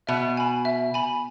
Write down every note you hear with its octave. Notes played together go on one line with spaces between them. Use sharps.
B2 E5
G#5 B5
E5
G#5 B5